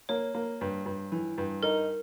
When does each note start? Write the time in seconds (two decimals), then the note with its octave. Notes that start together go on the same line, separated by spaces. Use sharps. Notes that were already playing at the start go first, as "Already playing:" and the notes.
0.09 A#3 C#5
0.34 A#3
0.61 G2
0.86 G2
1.12 E3
1.38 G2
1.63 D#4 A#4